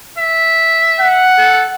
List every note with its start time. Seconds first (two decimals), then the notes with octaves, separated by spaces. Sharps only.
0.18 E5
1.00 F#5
1.38 A4